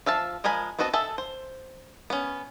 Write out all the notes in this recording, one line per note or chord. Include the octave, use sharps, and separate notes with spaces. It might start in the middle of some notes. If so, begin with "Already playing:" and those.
F3 E5 F5 A5
F3 G#3 A#4 G#5 B5
B3 C4 F#4 D#5 A5
G#4 A4 E5 A5
C5
B3 C#4